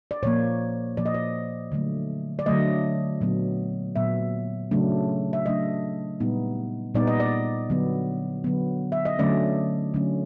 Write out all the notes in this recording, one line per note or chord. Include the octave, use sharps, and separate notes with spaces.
D5
A#2 F3 A#3 C#5
A#2 F3 A#3 D5
D#5
D5
D3 F#3 A3
D5
D3 F#3 A3 D#5
A#2 F#3 B3
A#2 F#3 B3 E5
C#3 F#3 A3 D4
E5
C#3 F#3 A3 D4 D#5
A#2 G3 B3 D#4
A#2 G3 B3 D#4 D5
D#5
D5
D3 F#3 B3
D3 F#3 B3
E5
D#5
D3 F#3 A3 C#4 D5
D3 F#3 A3 C#4